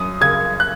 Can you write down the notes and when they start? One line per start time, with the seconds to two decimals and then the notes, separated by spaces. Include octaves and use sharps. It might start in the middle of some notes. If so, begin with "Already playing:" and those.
Already playing: F#2 D#6
0.21 C#3 G#6
0.60 F#6